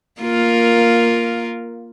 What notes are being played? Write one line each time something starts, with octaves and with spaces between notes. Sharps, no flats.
A#3 F4 A#4